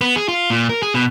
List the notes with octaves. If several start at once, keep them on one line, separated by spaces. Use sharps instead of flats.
B3
G#4
F4
A#2
A#4
G#4
B2